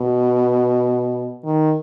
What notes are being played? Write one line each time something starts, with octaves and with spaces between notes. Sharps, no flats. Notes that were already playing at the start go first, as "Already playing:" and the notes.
Already playing: B2
D#3